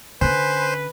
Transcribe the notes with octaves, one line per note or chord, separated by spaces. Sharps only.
D3 C#4 B4 C5 G#5 F#6